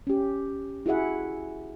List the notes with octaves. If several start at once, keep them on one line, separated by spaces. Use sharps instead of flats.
C#4 G4
E4 F#4 G#4 E5 F#5